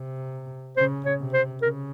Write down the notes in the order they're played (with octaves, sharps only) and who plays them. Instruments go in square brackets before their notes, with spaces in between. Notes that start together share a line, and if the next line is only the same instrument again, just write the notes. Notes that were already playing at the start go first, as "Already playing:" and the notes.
Already playing: [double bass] C3
[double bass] C#3 [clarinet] C5
[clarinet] C#5
[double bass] C3
[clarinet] C5
[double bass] C#3 [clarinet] A#4